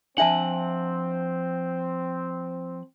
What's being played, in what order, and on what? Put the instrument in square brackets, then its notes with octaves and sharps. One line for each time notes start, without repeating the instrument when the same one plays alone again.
[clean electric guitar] F3 F#5 [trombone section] C4 [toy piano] D4 E5 A5